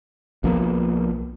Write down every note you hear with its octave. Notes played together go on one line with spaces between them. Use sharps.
B1 F3 A#3 B3